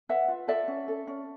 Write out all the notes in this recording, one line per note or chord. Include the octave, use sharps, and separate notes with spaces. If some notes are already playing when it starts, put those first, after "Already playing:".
B4 E5 F#5
F4
A4 D5 E5
C#4
A4
C#4